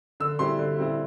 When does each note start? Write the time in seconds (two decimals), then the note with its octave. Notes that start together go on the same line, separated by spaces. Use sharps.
0.20 D3 E6
0.39 G3 C4 E4 C6
0.59 D3
0.78 G3 C4 E4